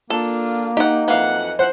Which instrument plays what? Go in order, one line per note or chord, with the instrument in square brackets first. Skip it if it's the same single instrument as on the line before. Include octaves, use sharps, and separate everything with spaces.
[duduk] A#3 [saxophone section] D4 F4 [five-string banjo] A4
[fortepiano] D#4 [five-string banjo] G4 F#5
[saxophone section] F2 F#3 F#5 [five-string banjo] E3 F5
[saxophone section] F3 E4 F#5 [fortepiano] C5